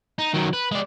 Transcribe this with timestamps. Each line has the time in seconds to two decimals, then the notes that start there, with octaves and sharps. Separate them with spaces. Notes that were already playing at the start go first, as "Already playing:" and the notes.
0.18 D#4
0.34 D#3 F#3
0.53 B4
0.72 G#3 D5